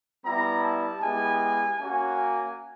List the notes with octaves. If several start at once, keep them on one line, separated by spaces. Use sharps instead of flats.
G3 B3 E4 G4 A#5
A5
G#3 B3 E4 G4 G#5
A#3 C#4 F#4 G#5